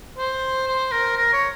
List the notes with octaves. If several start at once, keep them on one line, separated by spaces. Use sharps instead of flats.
C5
C5
A#4
A#4
C#5